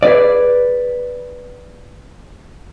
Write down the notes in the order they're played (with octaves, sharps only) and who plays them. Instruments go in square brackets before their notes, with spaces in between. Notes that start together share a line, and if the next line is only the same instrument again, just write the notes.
[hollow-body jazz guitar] G#4 B4 D5